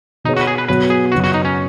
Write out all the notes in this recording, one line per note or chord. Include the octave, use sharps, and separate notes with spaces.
B2 B3 D#4 G#4 C#5
F#4
B4
G#4
B4
B2 F#3 B3 F#4 B4 C#5
G#4
F#2 C#3 B3 F#4
F#4
D#4
C#4